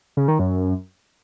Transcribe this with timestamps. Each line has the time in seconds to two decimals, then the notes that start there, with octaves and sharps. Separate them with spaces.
0.17 C#3
0.28 D#3
0.39 F#2